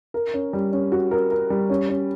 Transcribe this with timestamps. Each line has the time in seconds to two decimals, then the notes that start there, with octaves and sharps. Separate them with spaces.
0.14 A#4
0.34 C#4
0.53 G3
0.73 C#4
0.92 F#4
1.11 A#4
1.31 A#4
1.50 G3
1.70 C#4
1.89 C#4